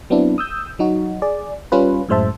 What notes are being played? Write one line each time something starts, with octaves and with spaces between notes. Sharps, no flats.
F#3 B3 C4 D4 E4
D#6 E6 G6
F#3 D#4 F#4
G#4 D5
G3 C#4 F4 B4
F#2 A2 G#3 C5 E5 A5